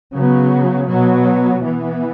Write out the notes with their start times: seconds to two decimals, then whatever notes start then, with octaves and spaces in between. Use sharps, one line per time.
0.13 C#3 F#3 B3
0.88 B2 F#3 B3
1.63 E3 B3